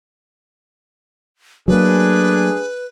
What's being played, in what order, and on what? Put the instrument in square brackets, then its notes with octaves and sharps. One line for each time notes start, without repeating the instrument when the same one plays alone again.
[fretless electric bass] F#3 A#3 [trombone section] A3 D4 G#4 [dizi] B4